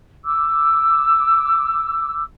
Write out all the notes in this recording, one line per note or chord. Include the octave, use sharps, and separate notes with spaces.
D6 E6